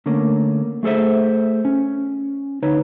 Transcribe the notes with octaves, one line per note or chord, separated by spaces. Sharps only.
D3 A3 A#3 C#4
A3 G#4 A4 C5 E5
C#4
D2 D#4 B4 C#5